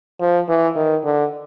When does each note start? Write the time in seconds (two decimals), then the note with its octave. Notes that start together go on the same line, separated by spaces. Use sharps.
0.21 F3
0.49 E3
0.76 D#3
1.04 D3